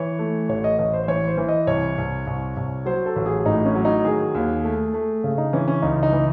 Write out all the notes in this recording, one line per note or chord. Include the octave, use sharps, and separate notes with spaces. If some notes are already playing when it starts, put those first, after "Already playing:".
Already playing: E3 C#5
A3
A1 C#5
D#5
A1 D#5
C5
C5
E3 C#5
C5
E3
D#5
C2 C#5
C2
C2
C2
F#3 C5
A4
A1
G#4
A2 D#4
C#4
F#3
D#4
D#3 G#4
D#2
A3
A3
C#3
D#4
E3 C#4
C#4
C#2 D#4
D#4
E3